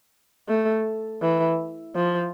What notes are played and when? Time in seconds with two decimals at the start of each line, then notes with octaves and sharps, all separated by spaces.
0.48 A3
1.22 E3
1.95 F3